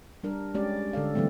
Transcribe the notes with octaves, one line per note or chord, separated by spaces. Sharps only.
G3 D4 A#4
G#3 C#4 G4 D5
D3 A4 D5 F5
D3 E3 G3 A3 C4